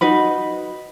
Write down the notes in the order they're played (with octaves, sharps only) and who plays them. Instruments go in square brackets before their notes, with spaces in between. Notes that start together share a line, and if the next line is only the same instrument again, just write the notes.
[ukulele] D#4 F#4 B4 B5